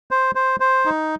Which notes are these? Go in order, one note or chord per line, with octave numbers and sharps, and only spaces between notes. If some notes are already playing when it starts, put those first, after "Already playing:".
C5
C5
C5
D#4